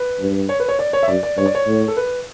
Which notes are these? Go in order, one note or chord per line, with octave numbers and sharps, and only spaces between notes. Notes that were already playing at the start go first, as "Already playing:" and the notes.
Already playing: B4
G2
C#5
B4
C#5
D5
C#5
E5
F#2 D5
D5
G2 C#5
D5
C#5
A2
A4
B4